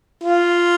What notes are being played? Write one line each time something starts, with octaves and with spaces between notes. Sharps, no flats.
F4